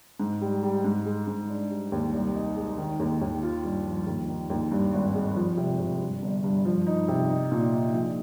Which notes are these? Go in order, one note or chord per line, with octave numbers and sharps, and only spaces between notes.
G#2
G3
G3
G#2
G#3
G#2
D4
G3
D#2
C2
D#4
G#3
D#3
D#2
D#2
F4
G2
F3
D#2
D#3
D#2
G2
G#1
G#3
F3
C3
C3
G2
G1
G2
F3
D#4
C3
D#4
A#2
D#4
A#1